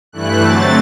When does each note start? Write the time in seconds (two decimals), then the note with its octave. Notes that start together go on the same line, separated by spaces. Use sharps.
0.12 G2 E3 A3 E4 F#6
0.41 D3 F#3 A3 C4 A6